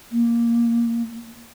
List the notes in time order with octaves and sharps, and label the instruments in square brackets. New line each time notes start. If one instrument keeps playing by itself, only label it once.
[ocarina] A#3